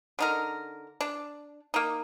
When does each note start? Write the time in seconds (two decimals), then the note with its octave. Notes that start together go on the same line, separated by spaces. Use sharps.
0.19 D3 D#4 A#4
1.01 D4
1.74 A#3 D#4